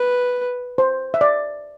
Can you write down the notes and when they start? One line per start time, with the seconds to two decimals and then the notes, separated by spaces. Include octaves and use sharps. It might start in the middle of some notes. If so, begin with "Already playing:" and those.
Already playing: B4
0.78 C5
1.14 E5
1.21 D5